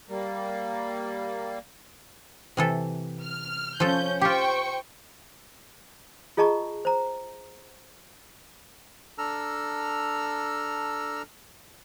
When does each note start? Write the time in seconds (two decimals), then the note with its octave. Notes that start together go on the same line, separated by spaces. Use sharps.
0.09 G3 A#3
2.57 C3 E3 A4
3.23 F6
3.80 F3 C#4 A4 G6
4.21 F4 G4 C5 G5 C#6
6.37 F4 G#4 D#5 A5 A#5 C#6
6.85 C5 A#5
9.18 D4 A4 A#5 E6 F6